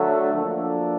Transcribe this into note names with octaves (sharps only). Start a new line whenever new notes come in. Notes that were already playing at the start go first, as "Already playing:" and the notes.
Already playing: D3 F#3 A3
F3 A#3 D4